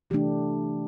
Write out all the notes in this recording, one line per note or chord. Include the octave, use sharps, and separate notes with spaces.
C3 E3 A3 D4 G4